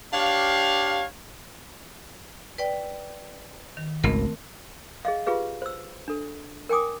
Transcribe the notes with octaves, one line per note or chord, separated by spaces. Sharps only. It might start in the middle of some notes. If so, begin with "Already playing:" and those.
D4 G4 C#5 F5
B4 D5 G5
D#3
G#1 C#2 A3 C4 A#4
G#4 D#5 F5
F4 G4 G#4 B4 F5
C5 E6
D4 A4
A#4 G5 G#5 D6 D#6